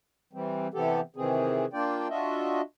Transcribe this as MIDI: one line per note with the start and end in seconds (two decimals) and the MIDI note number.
0.33 0.68 52
0.33 0.68 55
0.33 0.68 60
0.74 1.01 48
0.74 1.01 52
0.74 1.01 59
0.74 1.01 60
0.74 1.01 67
0.74 1.01 69
1.16 1.66 48
1.16 1.66 51
1.16 1.66 52
1.16 1.66 60
1.16 1.66 68
1.73 2.08 58
1.73 2.08 62
1.73 2.08 65
1.73 2.08 74
1.73 2.08 79
2.09 2.62 62
2.09 2.62 65
2.09 2.62 66
2.09 2.62 75
2.09 2.62 76